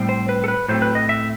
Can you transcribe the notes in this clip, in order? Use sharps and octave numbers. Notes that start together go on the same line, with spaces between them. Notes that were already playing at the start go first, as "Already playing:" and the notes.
Already playing: A2 G3 C4
C5
B4
A4
B4
A2 F#3 A3 C4 C5
B4
D#5
E5